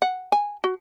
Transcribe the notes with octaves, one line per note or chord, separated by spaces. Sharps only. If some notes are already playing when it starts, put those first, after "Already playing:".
F#5
G#5
F#4